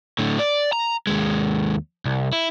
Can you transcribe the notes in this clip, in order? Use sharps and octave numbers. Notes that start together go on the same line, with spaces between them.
A2 D3
D5
A#5
D#2 G#3
C2
E4